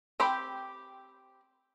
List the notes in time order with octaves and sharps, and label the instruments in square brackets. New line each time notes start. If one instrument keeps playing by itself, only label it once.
[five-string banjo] C4 G4 C5 G5 B5